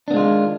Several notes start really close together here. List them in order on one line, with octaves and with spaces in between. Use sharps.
D4 B3 G#3 F4 D#3